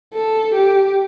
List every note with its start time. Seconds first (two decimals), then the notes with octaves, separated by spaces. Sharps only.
0.14 A4
0.54 G4